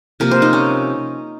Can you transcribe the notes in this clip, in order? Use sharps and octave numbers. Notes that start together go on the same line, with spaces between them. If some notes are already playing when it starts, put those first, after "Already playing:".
C3 F3 A#3 A#4
C5
D#4
C#4